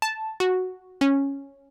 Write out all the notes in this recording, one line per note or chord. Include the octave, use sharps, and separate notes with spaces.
A5
F#4
C#4